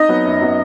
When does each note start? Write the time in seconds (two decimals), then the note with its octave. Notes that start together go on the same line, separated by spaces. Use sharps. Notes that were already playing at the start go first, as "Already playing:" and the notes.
Already playing: D#4 D#5
0.09 F#3 B3
0.26 F#2
0.41 F#3 B3